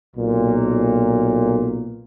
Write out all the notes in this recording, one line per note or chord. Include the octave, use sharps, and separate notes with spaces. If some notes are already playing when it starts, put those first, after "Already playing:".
B1 A#2